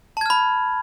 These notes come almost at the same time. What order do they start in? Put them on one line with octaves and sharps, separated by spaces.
A5 G#6 F6 B5